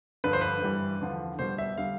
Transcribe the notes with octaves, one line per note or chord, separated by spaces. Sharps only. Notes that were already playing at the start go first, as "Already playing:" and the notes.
G2 D3 F3 B4
C5
B4
G2 E3 G3
E2 D3 F3
B2 G3 C5
E5
D3 G3 F5